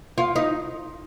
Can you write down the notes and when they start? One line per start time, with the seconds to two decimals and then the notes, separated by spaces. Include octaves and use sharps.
0.18 F4
0.36 D#4